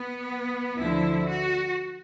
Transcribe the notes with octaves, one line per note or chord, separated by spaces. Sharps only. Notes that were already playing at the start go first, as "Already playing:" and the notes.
Already playing: B3
D2 D3 F3 E4
F#4